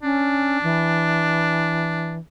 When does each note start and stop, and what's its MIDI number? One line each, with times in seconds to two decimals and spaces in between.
0.03 0.58 61
0.03 2.17 62
0.63 2.18 52